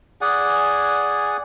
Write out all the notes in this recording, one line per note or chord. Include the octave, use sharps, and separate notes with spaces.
G#4 D5 F#5 G#5